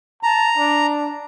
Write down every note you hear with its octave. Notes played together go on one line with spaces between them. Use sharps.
A5 A#5
D4